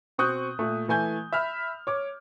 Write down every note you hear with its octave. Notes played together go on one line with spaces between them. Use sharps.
B2 C4 C#6 D#6 F#6 G6
A#2 A3
E3 A3 G#5 G6
E5 B5 F6
C#5 D6